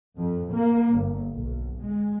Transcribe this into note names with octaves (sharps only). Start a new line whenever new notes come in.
F2
A#3
G1
B1
G#3